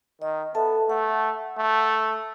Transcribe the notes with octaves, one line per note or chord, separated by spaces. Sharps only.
D#3 D#5
B3 A4 E5 A5
A3 F#5
A3